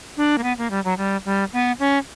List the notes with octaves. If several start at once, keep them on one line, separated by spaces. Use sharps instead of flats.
D4
A#3
B3
A#3
G3
F#3
G3
G3
B3
C#4